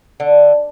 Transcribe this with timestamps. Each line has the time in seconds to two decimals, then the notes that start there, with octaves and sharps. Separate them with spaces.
0.20 D3